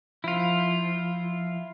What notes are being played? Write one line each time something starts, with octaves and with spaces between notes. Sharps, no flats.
F3 E4 F4